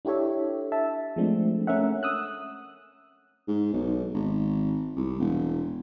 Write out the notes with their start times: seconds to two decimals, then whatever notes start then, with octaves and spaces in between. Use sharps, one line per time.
0.05 D4 E4 G4 A4 C#5 E5
0.72 E5 A5
1.16 F3 G#3 A3 C4 D4
1.67 A3 C#4 A#4 E5 F#5
2.03 D#6 E6 F#6
3.48 G#2
3.73 B1
4.14 G#1
4.97 C2
5.20 E1